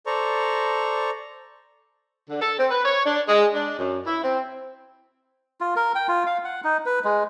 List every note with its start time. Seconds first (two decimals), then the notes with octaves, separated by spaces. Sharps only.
0.06 A4 C5 D5 A#5 C#6
2.29 D3
2.41 A4
2.59 C4
2.71 B4
2.85 C#5
3.06 D4
3.29 G#3
3.55 D4
3.78 F#2
4.06 E4
4.24 C4
5.61 F4
5.76 A#4
5.95 G5
6.08 F4
6.27 F5
6.45 F#5
6.64 D#4
6.86 B4
7.04 G#3